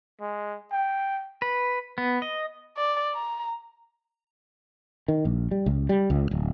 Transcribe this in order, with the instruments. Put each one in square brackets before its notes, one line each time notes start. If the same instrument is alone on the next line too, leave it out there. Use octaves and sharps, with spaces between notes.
[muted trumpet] G#3
G5
[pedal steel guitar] B4
B3
D#5
[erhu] D5
A#5
[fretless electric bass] D#3
A#1
G3
C#2
G3
C#2
D1